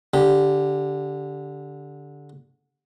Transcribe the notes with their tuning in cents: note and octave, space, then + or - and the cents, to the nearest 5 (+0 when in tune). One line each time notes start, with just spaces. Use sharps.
D3 -10 G4 +0